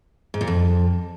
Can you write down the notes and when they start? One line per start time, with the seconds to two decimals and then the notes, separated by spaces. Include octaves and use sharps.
0.34 G#2
0.41 A#2
0.48 F2